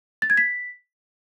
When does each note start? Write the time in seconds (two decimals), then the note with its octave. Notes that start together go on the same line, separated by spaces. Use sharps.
0.22 A6
0.30 G#6
0.37 B6